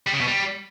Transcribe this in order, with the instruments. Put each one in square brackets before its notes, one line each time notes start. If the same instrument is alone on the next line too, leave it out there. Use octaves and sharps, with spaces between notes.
[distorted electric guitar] G3
C#3
B2
G3